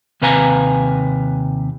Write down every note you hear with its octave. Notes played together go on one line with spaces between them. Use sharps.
D#2 C3 B4 F5 G#5 A#5